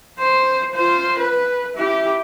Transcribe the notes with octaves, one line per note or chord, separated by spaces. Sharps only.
C5
F4 C5
B4
E4 G4